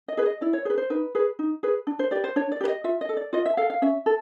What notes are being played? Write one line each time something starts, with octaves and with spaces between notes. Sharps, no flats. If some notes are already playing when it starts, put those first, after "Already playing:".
D#5
G#4 B4
D#5
E4 D5
C#5
G#4 B4 C5
C5
D#4 B4
G#4 B4
D#4
G#4 B4
D4
C5
G4 B4 D5
C5
D4 C#5
D5
G4 B4
D#5
F4 E5
D#5
A4
D5
F4 D#5
E5
A4 F5
F5
C#4 E5
A4